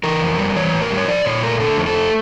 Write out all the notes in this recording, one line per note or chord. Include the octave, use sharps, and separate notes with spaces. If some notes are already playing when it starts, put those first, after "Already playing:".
E3 A#4
F2
G3
E3 C#5
A2
A#4
G3
C#5
F3 D5
A#2 C#5
A3 A#4
D3 A4
F2
A4
A3